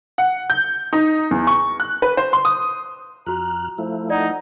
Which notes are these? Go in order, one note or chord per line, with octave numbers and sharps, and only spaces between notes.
F#5
G6
D#4
E2
C#6
F#6
B4
C5
C6
D#6
F2 F4 F#4 A#5 F6 F#6
F3 A3 E4 C5
D#4 D5 F#5 A#5